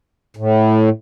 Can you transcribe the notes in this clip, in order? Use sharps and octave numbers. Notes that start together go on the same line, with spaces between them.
A2